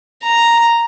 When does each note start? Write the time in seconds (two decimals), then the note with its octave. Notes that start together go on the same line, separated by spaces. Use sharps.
0.24 A#5